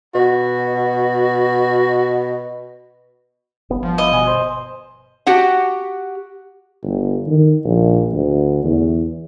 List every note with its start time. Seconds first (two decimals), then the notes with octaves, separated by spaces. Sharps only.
0.15 B2 F#4
3.70 G1 B3
3.83 F3
3.98 E4 D#5
4.12 B2 G#5
4.27 C5
5.27 F#4 G4 F#5
6.84 G1
7.27 D#3
7.65 A#1
8.13 D2
8.64 E2